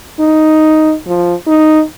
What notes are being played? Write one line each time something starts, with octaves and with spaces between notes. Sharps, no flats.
D#4
F3
D#4